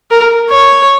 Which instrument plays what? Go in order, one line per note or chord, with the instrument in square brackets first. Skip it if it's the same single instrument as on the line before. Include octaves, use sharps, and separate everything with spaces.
[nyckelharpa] A#4
C#5